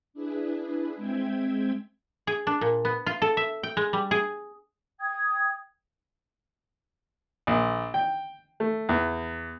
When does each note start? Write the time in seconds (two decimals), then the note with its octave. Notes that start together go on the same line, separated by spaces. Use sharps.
0.14 D4 E4 G#4 B4
0.96 G#3 C4 E5 G5 G#6
2.27 G#4
2.47 D4
2.61 A#2
2.85 B3
3.06 F4
3.22 A4
3.37 E5
3.63 G5
3.77 G#3
3.93 G3
4.11 G#4
5.00 G5 D#6 G#6
7.47 A#1
7.94 G5
8.60 A3
8.89 E2